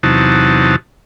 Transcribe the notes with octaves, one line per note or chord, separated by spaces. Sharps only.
E2 C3 F#3 D#4 A5